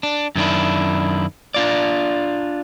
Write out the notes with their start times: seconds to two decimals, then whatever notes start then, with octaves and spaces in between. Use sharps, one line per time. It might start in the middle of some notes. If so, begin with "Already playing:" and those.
0.03 D4
0.35 F#2 D#3 D4 E4
1.54 D4 F4 D5